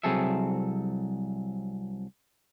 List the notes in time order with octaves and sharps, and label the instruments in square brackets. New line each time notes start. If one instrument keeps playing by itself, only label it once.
[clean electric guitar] C2 F#3 C4 G#4 A4 E5